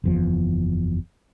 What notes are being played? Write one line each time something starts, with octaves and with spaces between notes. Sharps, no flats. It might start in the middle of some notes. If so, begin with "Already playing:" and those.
F#1 E2 F3